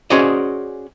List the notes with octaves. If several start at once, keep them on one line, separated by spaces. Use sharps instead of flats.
C#4 F#4 G#4 C5 D5 D#5